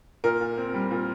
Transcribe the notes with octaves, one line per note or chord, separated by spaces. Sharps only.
A#2 A#4
A#2
C4
G3
A#2